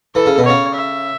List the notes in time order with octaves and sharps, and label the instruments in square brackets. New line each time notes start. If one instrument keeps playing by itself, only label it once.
[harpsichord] E3 [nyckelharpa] A4
[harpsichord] C#3
B2
[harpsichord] C#3 [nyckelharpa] C#5
[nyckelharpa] E5